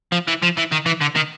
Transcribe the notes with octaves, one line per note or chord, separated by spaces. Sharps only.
F3
E3
F3
E3
D#3
E3
D3
D#3